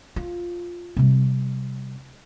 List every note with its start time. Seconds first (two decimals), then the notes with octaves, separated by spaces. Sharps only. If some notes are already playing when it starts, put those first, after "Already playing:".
0.16 F4
0.97 C3 G3